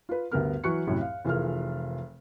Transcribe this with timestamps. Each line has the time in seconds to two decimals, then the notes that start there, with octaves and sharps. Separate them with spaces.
0.09 F4 B4
0.32 D2 G2 B3 A#4 F6
0.64 E3 F#3 C#6 F#6 C#7
0.87 C2 F#2 A2
1.01 F5
1.25 F1 E3 F4 G#4 A#4 F6